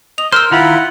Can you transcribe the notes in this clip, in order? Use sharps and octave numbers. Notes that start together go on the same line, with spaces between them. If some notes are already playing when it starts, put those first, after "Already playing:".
D#5 F7
A#4 C5 E6 F6
D#3 E4 F4 F#5 A#5 B5